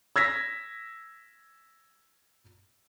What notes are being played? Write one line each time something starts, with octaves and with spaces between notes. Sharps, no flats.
E6 G#6 A#6 B6